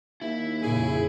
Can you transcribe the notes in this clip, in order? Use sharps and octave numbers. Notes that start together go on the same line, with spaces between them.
D#2 E4
F2 A#2 C#3 G#4